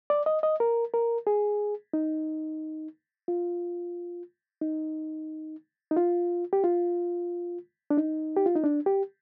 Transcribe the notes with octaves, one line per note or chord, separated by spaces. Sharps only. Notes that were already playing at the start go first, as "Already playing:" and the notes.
D5
D#5
D#5
A#4
A#4
G#4
D#4
F4
D#4
D#4
F4
G4
F4
D4
D#4
G4
F4
D#4
D4
G4